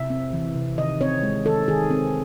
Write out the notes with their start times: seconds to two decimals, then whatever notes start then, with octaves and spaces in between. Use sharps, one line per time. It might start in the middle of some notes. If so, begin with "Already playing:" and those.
Already playing: C3 E5
0.10 C4
0.33 E3
0.56 C3
0.77 D#3 D#5
1.01 C4 C#5
1.23 G#3
1.45 D#3 A4
1.68 D#3 G#4
1.90 C4